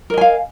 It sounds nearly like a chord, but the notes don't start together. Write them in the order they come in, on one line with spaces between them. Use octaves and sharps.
A#4 D#5 G#5 F5